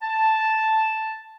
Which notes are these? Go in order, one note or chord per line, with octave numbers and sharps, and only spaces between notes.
A5